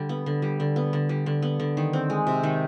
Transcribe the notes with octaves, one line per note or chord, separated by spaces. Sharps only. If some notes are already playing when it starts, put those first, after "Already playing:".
Already playing: D3 G3
B3
D3
G3
D3
B3
D3
G3
D3
B3
D3
D#3
C4
G#3
C3
D#3